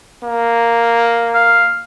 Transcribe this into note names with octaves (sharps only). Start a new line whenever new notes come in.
A#3
F5